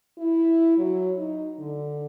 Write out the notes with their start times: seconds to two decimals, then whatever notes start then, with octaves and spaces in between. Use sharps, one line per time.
0.17 E4
0.78 F#3
1.18 D#4
1.59 D3